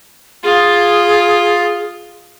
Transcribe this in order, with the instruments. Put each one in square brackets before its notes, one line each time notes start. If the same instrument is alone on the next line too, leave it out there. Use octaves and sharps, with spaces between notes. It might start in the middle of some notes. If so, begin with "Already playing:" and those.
[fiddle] F4 [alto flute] G#4